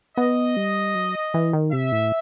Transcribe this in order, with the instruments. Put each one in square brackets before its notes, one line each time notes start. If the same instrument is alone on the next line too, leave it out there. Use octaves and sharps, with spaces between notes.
[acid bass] B3 [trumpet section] D#5
[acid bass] G3
F#3
E3
D#3
[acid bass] C3 [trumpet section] E5
[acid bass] A2